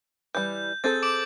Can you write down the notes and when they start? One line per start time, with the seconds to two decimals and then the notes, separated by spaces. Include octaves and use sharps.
0.35 E3 G3 G6
0.84 C4 G#4 A4 G6 A6
1.03 D6 D7 F#7